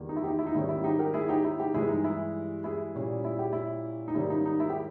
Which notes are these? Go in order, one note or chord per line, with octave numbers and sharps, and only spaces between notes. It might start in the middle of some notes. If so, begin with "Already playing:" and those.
Already playing: E2 D#3 G3 A#3
D#4
E4
D#4 G4
E4
D#4
G#2 D#3 G3 C#4 E4
E4
D#4 G4
G4 A#4
E4 G#4
D#4 G4
E4
D#4 G4
G2 E3 G#3 E4 G#4
D#4
E4
E4 G#4
A#2 G3 C#4
E4
G4
E4
D#4
G#2 D#3 G3 A#3 C#4 E4
D#4
D#4
E4
G4